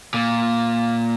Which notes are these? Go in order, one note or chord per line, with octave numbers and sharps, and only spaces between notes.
A#2